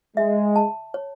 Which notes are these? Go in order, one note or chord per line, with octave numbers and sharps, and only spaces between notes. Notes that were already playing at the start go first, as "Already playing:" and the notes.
G#3 E5
A5
C#5